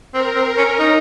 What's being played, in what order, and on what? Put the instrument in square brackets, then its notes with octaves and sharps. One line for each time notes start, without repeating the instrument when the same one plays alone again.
[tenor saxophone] C4 [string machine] A#4
[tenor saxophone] C4
C#4
D#4